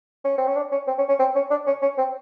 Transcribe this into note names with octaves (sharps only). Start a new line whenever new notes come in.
C#4
C4
C#4
D4
C#4
C4
C#4
C#4
C4
C#4
D4
C#4
C#4
C4